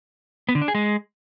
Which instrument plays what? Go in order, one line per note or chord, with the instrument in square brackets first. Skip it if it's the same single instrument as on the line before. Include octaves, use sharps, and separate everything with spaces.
[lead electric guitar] B3
D3
D4
G#4
G#3